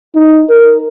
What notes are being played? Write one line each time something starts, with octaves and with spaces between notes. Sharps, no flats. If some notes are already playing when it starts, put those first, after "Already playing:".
D#4
A#4